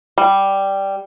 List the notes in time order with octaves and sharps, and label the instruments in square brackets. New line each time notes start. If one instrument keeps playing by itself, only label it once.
[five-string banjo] G3